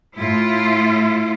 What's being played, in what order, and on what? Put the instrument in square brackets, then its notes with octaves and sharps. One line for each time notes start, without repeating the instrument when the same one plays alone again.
[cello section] A2 E4 F4